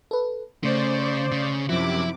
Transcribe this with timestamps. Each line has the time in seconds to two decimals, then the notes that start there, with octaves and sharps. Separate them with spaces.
0.11 A4 B4
0.64 C#3 A3 C5 D5
1.32 C#3
1.69 F#2 C3 F3 E4 D6